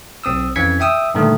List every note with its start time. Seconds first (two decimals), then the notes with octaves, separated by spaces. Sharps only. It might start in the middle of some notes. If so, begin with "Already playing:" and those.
0.24 B1 C4 D#6 E6
0.56 F2 E3 C#4 G#6 B6 C#7
0.80 E5 G5 D#6 E6
1.14 G2 A#2 D3 D#3 A3